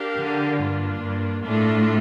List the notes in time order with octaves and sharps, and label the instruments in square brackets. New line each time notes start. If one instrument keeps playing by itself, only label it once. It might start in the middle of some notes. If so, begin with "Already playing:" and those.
Already playing: [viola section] D4 G4 A#4 F5
[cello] D3
[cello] G2 [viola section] A#3 D4 F4
[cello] G2
[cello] A2 [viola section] D4 F4 A4